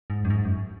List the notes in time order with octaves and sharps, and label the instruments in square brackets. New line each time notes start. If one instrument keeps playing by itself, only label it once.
[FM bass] G#2
F#2
G#2
F#2